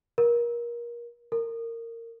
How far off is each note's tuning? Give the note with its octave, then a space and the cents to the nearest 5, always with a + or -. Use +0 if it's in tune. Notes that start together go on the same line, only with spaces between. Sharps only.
A#4 +25
A#4 -20